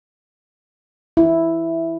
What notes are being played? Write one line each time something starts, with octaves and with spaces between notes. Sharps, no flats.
E4